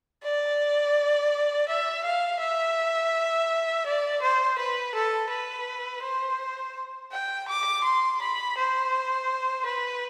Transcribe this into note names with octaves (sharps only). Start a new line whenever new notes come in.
D5
E5
F5
E5
D5
C5
B4
A4
B4
C5
G5
D6
C6
B5
C5
B4